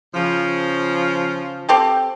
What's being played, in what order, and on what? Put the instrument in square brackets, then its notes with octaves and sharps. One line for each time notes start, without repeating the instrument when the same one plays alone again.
[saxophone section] C#3 F3
[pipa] C4 G4 A4